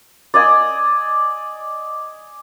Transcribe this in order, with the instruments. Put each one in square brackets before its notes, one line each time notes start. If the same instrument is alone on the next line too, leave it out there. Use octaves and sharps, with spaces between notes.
[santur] D5 D#5 G#5